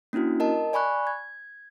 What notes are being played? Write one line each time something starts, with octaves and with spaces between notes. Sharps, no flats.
A#3 C#4 D4 E4 F#4
A#4 D#5 A5
D5 G#5 B5 C#6 F#6
G#6